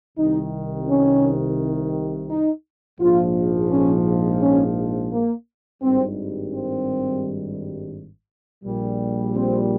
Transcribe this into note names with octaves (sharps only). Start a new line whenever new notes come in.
C2 C3 D#3 D#4
C#4
D#4
A#1 G#2 F3 F4
C#4
C#4
A#3
G#1 G2 D#3 G3 C4
C4
A#1 A#2 G3
C4